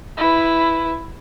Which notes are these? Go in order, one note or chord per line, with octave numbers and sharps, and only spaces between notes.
E4 B4